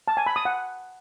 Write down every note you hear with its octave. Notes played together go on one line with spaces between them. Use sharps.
A5
G#5
B5
D#6
F#5